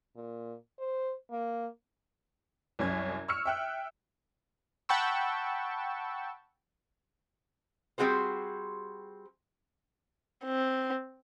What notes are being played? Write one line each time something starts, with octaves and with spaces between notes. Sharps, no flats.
A#2
C5
A#3
C2 F#2 C#4 G#6
C#6 E6 F6 C#7
E5 G5 F#6
F#5 G5 A5 B5 C#6 E6
G3 C4 F#4 G#4 C5
C4